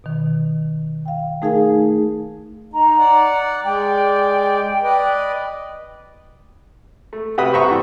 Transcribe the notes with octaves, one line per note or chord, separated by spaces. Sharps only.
B2 D#3
F5 G5
A3 D#4 G#4 A#4 F5 G#5
D#4 A#5
D5 F#5
G#3 D5 G5
B4 D5 D#5
A3
C3 F#4 B4 G5 B5 D#6
C5 E5 A#5 C#6
G2 E3